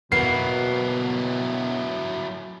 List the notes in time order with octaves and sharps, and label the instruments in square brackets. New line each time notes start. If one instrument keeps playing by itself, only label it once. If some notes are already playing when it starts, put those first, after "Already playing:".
[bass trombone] B2 [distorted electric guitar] F#3 E4 [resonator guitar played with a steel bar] A#3 B3 [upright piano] C7